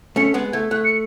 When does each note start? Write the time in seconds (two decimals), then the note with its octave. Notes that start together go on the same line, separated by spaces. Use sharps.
0.16 A3 C#4 C#7
0.34 G#3 B3
0.53 A3 G#6
0.71 A3 F#6
0.84 C#7